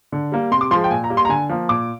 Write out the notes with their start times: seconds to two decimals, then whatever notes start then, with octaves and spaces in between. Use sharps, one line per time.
0.12 D3
0.32 G3 A#3
0.51 C3 C6
0.61 D6
0.71 F3 C6
0.75 G#3
0.84 G5
0.91 A#2 G#5
1.04 A#5
1.10 G3 A#3
1.17 C6
1.25 A#5
1.29 D3 G#5
1.49 F3 A#3
1.69 A#2 D6